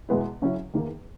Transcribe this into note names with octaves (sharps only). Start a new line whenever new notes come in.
E2 B2 G#3 B3 E4
C#3 F#3 C#4 E4
E2 D#3 A#3